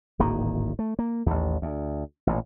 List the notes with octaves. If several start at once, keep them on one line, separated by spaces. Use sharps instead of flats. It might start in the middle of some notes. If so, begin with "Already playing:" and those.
D1 G#1 D#3 A#3
A3
A#3
A1 D#2
D2
A1 A#2